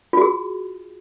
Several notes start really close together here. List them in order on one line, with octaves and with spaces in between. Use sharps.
F4 F#4 G#4